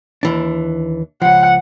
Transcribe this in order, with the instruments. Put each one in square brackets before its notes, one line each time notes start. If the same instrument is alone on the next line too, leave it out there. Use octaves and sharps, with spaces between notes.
[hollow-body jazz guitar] D#2 E3 D4
[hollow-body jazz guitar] C#2 F3 [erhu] F#5